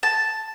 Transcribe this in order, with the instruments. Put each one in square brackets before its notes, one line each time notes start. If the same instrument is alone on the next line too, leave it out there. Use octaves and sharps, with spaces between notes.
[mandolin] A5